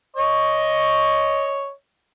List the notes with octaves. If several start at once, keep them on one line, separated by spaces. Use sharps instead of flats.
C#5 D#5 C#6